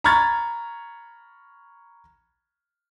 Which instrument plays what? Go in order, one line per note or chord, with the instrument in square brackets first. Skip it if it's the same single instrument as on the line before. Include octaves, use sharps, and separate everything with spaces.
[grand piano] A#5 B5 C#6 F6 G#6 A6